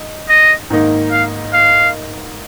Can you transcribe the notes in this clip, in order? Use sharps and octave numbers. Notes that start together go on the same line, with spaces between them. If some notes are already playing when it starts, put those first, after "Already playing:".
Already playing: D#4
D#5
G#2 D#3 A#3 D#4
F5
F5